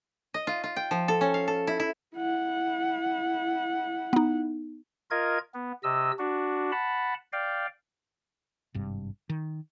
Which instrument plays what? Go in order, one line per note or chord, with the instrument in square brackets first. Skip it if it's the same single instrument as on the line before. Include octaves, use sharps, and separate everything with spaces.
[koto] D#5
F4
F4
G5
F3
A4
C#4
F5
A4
E4
E4
[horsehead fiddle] E4 F#5
[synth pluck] B3 D#4
[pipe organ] F4 A#4 D#5 G#6
B3
C3 D#5 E6
D4 F#4
F#5 A5 B5
D5 F5 G5
[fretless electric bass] G#1 G2 C3
D#3